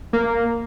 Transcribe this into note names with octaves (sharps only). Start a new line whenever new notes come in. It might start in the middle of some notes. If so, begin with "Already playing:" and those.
A#3